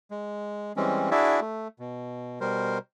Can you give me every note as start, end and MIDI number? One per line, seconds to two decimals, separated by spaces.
0.11 0.72 56
0.77 1.10 52
0.77 1.10 55
0.77 1.10 56
0.77 1.10 60
0.77 1.10 61
1.11 1.40 62
1.11 1.40 64
1.11 1.40 66
1.11 1.40 68
1.11 1.40 74
1.11 1.40 76
1.41 1.68 57
1.79 2.39 47
2.41 2.78 47
2.41 2.78 55
2.41 2.78 70
2.41 2.78 72